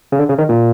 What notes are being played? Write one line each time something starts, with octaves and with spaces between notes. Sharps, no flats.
C#3
D3
C#3
D#3
A#2